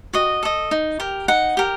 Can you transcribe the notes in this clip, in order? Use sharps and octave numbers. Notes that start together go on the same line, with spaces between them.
F#4 D#5
A4 D#5
D#4
G4 A#4
D#4 F#5
G4 A#4